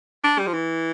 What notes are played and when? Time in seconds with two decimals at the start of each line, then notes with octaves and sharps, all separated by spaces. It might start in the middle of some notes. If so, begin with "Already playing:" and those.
0.24 D4
0.39 G3
0.47 F3
0.54 E3